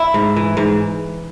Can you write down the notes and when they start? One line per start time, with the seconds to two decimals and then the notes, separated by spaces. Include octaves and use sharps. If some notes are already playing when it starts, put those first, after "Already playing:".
Already playing: E4
0.14 G#2
0.36 E3
0.57 G#2